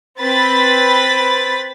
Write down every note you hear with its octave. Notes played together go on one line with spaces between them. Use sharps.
C4 B4 B5 A6 B6